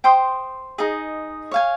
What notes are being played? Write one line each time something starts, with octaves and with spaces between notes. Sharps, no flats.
C5 G5 C6 D#6
D#4 G#4 D#5
C#5 F5 G#5